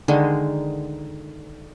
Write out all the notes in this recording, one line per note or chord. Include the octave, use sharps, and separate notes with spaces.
D3 D#3 G#3